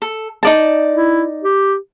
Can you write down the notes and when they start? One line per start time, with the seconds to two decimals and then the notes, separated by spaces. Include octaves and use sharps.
0.02 A4
0.43 D#4 D5 A5
0.95 E4
1.43 G4